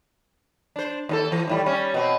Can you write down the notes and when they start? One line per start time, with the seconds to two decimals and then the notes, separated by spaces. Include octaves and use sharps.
0.76 D4 C5
1.09 D#2 C#4 A4
1.32 E3
1.48 D#2 A2 G3
1.66 G3 C#4
1.94 B2 C4